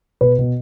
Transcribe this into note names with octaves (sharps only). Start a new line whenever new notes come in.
B2 B4
B2